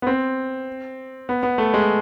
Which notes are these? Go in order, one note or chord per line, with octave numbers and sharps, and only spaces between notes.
B3
C4
B3
B3
A3
G#3